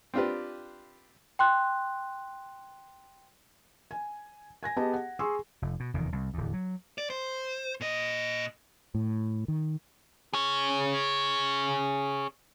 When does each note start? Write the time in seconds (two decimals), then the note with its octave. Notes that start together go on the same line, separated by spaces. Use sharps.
0.14 C4 D4 F4 G4 B4
1.39 G5 C6 F#6
3.91 G#5
4.63 G#5 G#6 A#6
4.76 B3 G4 G#4 D#5 A5
4.93 F#5
5.19 G#4 C6 C#6 E6
5.62 F1
5.80 B2
5.94 F1 E2 D#3
6.12 C2
6.34 D1 E2
6.54 F#3
6.98 D5
7.10 C5
7.81 A#2 D#5
8.95 A2
9.48 D#3
10.34 G#4 C#5